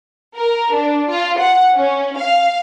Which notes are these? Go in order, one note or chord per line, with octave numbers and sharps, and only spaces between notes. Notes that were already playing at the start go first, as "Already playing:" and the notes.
A#4
D4
F4
F#5
C#4
F5